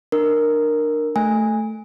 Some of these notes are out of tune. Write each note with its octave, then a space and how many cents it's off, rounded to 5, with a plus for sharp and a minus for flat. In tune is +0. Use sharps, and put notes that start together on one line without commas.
D4 +30 A#4 +0
A3 +0 G#5 -15